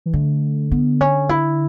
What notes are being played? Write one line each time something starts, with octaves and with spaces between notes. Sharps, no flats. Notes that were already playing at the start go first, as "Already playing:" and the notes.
E3
D3 A3
B3
C#4
E4